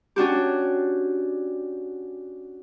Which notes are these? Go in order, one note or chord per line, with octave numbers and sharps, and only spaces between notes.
C#4 D4 F#4 G4